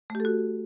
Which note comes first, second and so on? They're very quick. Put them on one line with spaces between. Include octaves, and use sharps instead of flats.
A3 G4 A4 F#4